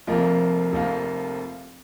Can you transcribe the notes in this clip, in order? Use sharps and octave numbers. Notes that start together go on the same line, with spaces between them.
F1 F2 F3 A#3 F4
F1 F2 F3 A#3 F4